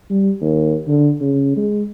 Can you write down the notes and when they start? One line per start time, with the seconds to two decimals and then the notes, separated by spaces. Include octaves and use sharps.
0.10 G3
0.41 D#2
0.88 D3
1.21 C#3
1.57 G#3